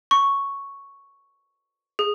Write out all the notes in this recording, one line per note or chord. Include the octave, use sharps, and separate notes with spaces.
C#6
G#4